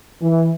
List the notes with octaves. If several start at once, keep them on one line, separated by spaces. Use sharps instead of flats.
E3